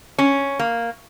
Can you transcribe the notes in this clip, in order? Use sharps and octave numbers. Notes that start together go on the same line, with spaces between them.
C#4
A#3